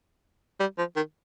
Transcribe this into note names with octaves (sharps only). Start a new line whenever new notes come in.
G3
F3
D#3